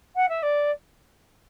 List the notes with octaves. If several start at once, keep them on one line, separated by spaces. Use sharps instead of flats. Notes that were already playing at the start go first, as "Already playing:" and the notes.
F#5
E5
D5